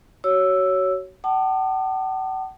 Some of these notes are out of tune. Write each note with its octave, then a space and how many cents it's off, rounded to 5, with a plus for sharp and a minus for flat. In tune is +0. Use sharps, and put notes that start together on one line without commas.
F#4 +30 C#5 +0 E6 +0
F#5 +45 A5 +0 D6 +45